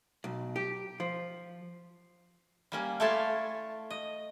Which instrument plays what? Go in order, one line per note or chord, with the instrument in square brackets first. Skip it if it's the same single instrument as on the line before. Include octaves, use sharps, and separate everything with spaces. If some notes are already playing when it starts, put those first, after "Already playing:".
[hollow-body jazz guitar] B1
G4
F3
[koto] G3 A#3 C#4
A3 E4 F4 C#5 D5 A5
D#5